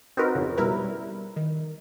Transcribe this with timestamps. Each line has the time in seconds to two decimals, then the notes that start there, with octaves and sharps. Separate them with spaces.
0.17 C4 D#4 F#4 A#4 B4
0.35 F2 C#3
0.58 B2 G3 E4 A#4 B4
0.84 G3
1.36 D#3